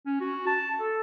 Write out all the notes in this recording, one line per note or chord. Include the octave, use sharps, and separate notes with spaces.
C#4
F#4
A5
A4